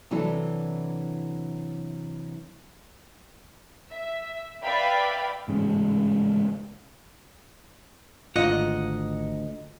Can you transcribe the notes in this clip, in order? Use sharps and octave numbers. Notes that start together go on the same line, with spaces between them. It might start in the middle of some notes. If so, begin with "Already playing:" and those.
C3 E3 F#3 D4 E4 A4
E5
B4 D5 E5 F5 G5 B5
A1 G#2 C#3
G#1 D2 F4 D#5 F#5 A#5